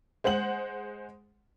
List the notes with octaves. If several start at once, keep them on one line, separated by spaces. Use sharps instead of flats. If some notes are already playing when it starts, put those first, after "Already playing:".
G#3 C5 F#5 F#7